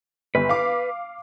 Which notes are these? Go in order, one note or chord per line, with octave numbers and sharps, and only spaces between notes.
G1 B4
F5 D6